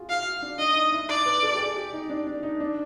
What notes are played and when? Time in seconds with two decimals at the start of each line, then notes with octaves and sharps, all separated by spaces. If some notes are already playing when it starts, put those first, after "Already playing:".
Already playing: F4 F#4 G#4
0.09 E4 F5
0.25 F#4
0.42 D4
0.58 D4 D#5
0.75 D#4
0.93 E4
1.09 D5
1.26 B4
1.43 A4
1.55 G4
1.59 G#4
1.77 G4
1.93 D#4
2.10 D4
2.27 D4
2.43 D#4
2.60 D4